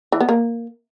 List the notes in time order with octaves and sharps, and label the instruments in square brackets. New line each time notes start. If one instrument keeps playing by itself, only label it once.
[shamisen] E3
B3
A#3